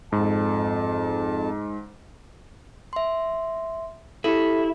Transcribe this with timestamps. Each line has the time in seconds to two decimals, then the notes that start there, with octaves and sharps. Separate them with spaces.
0.12 F2 G#2 A5
2.93 E5 C6
4.24 E4 G4 A4